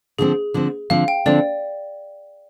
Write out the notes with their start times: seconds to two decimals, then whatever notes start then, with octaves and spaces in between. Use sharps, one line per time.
0.19 D3 F3 C4 G#4
0.54 D3 F3 C4
0.90 D3 F3 C4 F5
1.08 G5
1.26 D3 F3 C4 D5